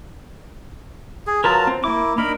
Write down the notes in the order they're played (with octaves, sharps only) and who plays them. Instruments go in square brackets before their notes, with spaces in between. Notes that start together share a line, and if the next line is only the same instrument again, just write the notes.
[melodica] G#4
[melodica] F#3 F4 A5 [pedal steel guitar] A#4 B4 A#5
[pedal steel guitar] C4
[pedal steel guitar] A#3 D6 [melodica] E4
[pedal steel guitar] A#3 D4 D#4 [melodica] A#4 B5